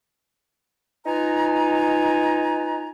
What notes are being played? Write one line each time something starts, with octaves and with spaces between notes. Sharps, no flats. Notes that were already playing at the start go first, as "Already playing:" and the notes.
D#4 F4 B4 G#5 A#5